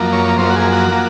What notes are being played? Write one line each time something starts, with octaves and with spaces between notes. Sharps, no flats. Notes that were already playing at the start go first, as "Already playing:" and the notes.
Already playing: F#2 F3 A#3
C#5
F#2 F3 A#3 C5
F#4
G#4
F#4
F3 A#3